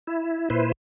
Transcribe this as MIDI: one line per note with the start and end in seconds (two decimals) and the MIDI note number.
0.07 0.49 64
0.50 0.72 46
0.50 0.72 64
0.50 0.72 71
0.50 0.72 72